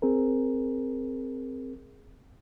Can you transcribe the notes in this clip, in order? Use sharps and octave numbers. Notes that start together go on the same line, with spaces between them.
C4 G#4 A#4